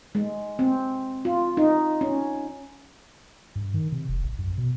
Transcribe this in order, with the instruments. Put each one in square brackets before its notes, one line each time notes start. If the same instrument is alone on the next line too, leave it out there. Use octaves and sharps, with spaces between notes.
[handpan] G#3
C4
F4
D#4
C#4
[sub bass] G2
D#3
C3
F1
A1
F#2
B2